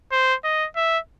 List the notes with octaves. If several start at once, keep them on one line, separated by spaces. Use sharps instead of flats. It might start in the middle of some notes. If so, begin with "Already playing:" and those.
C5
D#5
E5